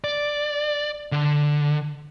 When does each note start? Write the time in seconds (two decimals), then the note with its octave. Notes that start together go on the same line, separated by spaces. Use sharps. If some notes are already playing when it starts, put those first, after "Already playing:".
0.04 D5
1.12 D3